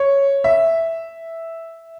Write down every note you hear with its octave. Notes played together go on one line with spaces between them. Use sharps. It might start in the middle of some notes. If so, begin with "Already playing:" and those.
Already playing: C#5
E5